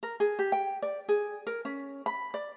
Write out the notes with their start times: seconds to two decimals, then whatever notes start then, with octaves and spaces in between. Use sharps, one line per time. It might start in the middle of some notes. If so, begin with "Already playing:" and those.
0.03 A#4
0.20 G#4
0.39 G4
0.52 G5
0.82 D5
1.09 G#4
1.47 A#4
1.65 C#4
2.06 B5
2.34 D5